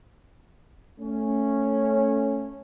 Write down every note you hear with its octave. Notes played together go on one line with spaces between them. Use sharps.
A3 C#4